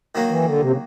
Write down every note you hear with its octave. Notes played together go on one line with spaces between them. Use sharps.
D#3 F#3 A#3
E3
D3
C3
C#3